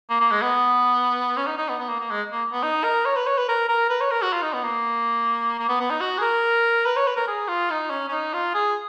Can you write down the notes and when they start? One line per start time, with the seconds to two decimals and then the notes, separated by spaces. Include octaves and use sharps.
0.10 A#3
0.20 A#3
0.31 G#3
0.42 B3
1.37 C#4
1.47 D#4
1.57 D#4
1.69 B3
1.79 B3
1.89 A#3
2.00 A#3
2.11 G#3
2.32 A#3
2.53 B3
2.63 D#4
2.84 A#4
3.05 C#5
3.16 B4
3.27 C#5
3.38 B4
3.48 A#4
3.68 A#4
3.90 B4
4.01 C#5
4.11 A#4
4.22 F#4
4.33 F4
4.42 D#4
4.53 B3
4.64 A#3
5.59 A#3
5.69 B3
5.80 B3
5.90 D#4
6.01 F#4
6.18 G#4
6.21 A#4
6.86 B4
6.97 C#5
7.07 B4
7.17 A#4
7.27 G#4
7.48 F4
7.70 D#4
7.90 C#4
8.08 C#4
8.11 D#4
8.33 F4
8.54 G#4